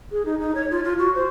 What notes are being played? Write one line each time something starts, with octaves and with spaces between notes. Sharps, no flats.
G#4
D#4
D#4
C#5
F4
F4
F#4
C5